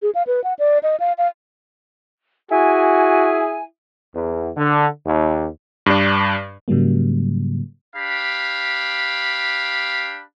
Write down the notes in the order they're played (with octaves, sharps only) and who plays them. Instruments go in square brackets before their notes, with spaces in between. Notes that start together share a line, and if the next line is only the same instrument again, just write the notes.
[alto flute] G#4
F5
B4
F#5
D5
D#5
F5
F5
[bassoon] E4 [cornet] F#4 [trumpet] G#4 [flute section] G#5
[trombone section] E2
D3
D#2
[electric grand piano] G2 D4
[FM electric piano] G#2 C#3 F#3 G3 A#3
[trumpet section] D4 G4 F5 B5